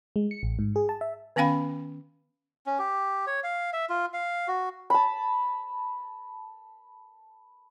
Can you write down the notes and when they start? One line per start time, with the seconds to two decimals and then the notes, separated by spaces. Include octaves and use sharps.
0.16 G#3
0.31 C#7
0.43 A1
0.59 G#2
0.76 G#4
0.89 A5
1.01 E5
1.36 D#3 B3 C#4 F5 G5 B5
2.66 C#4
2.79 G4
3.27 C#5
3.44 F5
3.73 E5
3.90 F4
4.13 F5
4.48 F#4
4.90 A5 B5